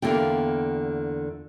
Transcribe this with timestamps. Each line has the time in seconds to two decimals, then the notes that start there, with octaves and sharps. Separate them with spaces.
0.02 E2 D3 A#3 F4 G5